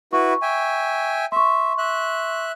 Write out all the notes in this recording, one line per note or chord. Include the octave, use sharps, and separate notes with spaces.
E4 F#4 B4 C#6
E5 G5 G#5
E5 C6 C#6
E5 F#6